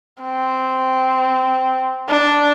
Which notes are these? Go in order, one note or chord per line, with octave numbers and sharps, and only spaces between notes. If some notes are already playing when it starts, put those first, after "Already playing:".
C4
D4